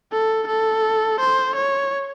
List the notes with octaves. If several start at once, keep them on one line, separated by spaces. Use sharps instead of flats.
A4
A4
C5
C#5